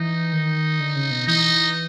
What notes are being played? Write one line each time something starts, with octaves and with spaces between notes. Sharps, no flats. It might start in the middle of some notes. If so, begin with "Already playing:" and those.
Already playing: E3 D#4
D#3
D3
C#3
B2
E3 D#4